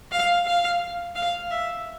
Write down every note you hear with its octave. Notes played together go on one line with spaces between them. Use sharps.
F5
F5
F5
E5